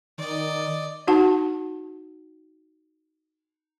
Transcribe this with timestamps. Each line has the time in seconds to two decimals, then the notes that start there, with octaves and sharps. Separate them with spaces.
0.18 D#3 D5 D#5
1.07 D#4 F#4 F#5 A5